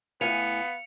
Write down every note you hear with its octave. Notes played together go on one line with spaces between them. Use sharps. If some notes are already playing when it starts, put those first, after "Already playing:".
A2 B3 F5 G#5 C#7 F7